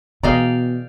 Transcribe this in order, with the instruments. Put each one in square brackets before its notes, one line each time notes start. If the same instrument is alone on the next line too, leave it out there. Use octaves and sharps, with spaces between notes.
[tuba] B2 [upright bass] E3 [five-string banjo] G#4 D#5 A#5 [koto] D5 F5 G5